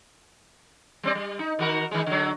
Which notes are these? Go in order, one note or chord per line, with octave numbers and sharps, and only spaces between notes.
G3 C4 D5
G3
D#4
D#3 F#4 A#4
D#3 G#3
D3 F#3